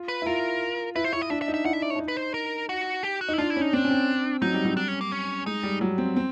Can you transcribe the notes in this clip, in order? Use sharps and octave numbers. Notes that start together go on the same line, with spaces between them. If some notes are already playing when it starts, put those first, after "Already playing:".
Already playing: F4
B4
E4
F4 A#4
E4 B4
C5
E4 C#5
D#5
D4 E5
E5
D#4
E5
E4 F#5
E5
D5
C#5
D4
D#4
B4
C5
A#4
F#4
G4
F#4
D#4 E4
D4 F4
E4
C#4
D#4
C4 D4
C#4
C4
F#3 D#4
G3
F#3
G3 D4
C#4
A#3
C#4
G#3 D#4
G3
F#3
C4
C4